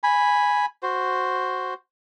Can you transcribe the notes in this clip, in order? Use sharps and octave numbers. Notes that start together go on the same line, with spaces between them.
G#5 B5
F#4 C5